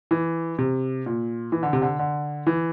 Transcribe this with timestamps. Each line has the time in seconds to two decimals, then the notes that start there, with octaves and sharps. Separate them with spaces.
0.11 E3
0.58 C3
1.06 A#2
1.52 E3
1.63 D3
1.73 C3
1.82 D3
1.99 D3
2.47 E3